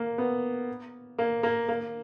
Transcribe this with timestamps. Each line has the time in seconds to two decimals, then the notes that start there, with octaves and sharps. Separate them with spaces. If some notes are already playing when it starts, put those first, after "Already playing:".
Already playing: A#3
0.18 B3
1.18 A#3
1.43 A#3
1.69 A#3